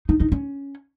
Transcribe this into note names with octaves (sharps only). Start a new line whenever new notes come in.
D#4
D#4
C#4